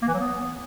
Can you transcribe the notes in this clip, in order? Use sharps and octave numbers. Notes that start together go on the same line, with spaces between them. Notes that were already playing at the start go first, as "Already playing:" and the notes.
A#3
E3
F#3
B3